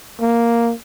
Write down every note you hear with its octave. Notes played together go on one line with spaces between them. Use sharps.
A#3